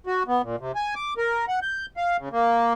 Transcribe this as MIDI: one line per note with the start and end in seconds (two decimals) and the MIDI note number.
0.07 0.23 66
0.28 0.42 59
0.43 0.56 46
0.59 0.72 48
0.76 0.94 80
0.95 1.14 86
1.18 1.45 70
1.48 1.60 78
1.62 1.86 91
1.97 2.17 77
2.19 2.29 49
2.32 2.73 58